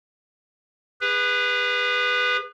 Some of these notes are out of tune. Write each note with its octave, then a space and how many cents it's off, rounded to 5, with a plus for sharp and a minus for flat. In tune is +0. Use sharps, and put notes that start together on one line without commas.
G#4 -40 B4 +0